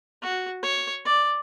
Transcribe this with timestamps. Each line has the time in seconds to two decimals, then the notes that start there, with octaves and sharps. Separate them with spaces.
0.22 F#4
0.62 C#5
1.05 D5